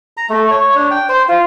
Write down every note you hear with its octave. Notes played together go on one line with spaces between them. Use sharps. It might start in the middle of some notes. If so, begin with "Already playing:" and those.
A#5
A3
C#5
D4
G5
C5
F4